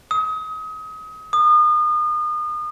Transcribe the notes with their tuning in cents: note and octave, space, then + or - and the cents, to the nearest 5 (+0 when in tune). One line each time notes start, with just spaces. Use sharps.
D#6 +30
D#6 -35